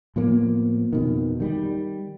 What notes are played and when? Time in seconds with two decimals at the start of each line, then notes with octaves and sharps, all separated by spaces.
0.16 A2 F3 A#3 B3
0.93 F2 B2 D#3
1.40 D#3 G3